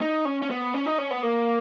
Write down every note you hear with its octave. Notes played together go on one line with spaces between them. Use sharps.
D#4
C#4
C#4
B3
C#4
D#4
C#4
B3
A#3